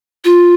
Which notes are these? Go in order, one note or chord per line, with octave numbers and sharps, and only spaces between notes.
F4